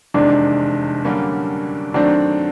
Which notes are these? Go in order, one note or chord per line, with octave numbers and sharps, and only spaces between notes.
F1 E2 C3 D#3 G#3 D4
F#2 D3 G3 A#3 C#4
F#2 D#3 F#3 A3 C4 D4